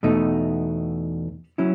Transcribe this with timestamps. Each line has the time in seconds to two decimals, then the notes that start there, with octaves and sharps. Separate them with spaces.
0.03 E2 B2 A3 D#4
1.58 F#3 C#4 E4